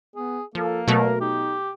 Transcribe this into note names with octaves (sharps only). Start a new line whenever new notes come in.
B3 G#4
F3 A#3 A4
B2 F#3 A3 A#4
D#4 G4